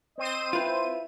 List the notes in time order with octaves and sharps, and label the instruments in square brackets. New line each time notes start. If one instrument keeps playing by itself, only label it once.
[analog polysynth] C4 C5 D#7 [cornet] D#5
[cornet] E4 [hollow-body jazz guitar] F4 B4